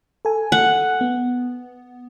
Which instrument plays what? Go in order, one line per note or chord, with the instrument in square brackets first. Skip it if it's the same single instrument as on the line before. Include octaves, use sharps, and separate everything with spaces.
[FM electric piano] A4 G#5
[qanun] F#5
[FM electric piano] B3